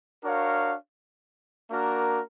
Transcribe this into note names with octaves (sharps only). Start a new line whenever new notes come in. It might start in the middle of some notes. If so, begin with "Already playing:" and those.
D4 F#4 A#4 C#5 F5
A#3 D4 F#4 A#4